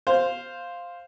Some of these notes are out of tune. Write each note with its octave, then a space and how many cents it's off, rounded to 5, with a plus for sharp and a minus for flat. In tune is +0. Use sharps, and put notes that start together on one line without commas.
C5 +0 F5 +0